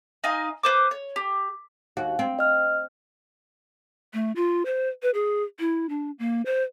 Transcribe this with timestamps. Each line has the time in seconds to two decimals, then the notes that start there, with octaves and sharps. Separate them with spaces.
0.24 D#4 D#5 F5 G#5
0.63 B4 C5 D6
0.91 C#5
1.16 G4
1.97 D#2 F#4
2.19 C4
2.39 D#5 F6
4.13 A3
4.36 F4
4.65 C5
5.02 B4
5.14 G#4
5.59 E4
5.89 D4
6.19 A#3
6.46 C5